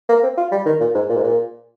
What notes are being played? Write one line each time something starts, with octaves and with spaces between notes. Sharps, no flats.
A#3
C4
F4
G3
D#3
A#2
G#2
A#2
G#2
A#2